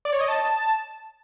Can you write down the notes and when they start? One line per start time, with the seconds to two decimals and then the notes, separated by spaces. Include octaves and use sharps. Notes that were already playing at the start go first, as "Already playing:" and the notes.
0.05 D5
0.13 C#5
0.20 D#5
0.28 A5